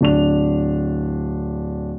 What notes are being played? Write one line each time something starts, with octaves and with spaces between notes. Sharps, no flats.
D1 D4 F7